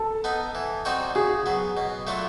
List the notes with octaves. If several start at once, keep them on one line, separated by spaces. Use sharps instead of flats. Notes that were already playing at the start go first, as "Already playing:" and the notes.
Already playing: A4
B3 D#4
E3
G3 C4 D#4 F#4
C#3 G#4
F#3 B3
B2
F#3 A3 D4 F4